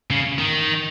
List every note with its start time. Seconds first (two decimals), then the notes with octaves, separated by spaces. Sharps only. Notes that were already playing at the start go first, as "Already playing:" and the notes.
0.11 C#3
0.38 D#3